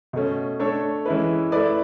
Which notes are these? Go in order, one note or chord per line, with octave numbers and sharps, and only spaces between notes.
B2 A3 C#4
A3 D4 A4 C#5
E3 G#3 C#4 E4 B4
A3 E4 B4 D5